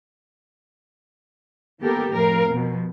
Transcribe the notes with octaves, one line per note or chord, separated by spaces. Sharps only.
D#3 A#3 B3 G4 A4 A#4
F2 A2 F3 A#4 F5
B2 F3